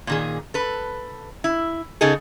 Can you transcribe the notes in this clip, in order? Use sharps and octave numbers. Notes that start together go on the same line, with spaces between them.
A#2 D#3 G#4
A4 B4
E4
C#3 B3 D#4 G#4 A4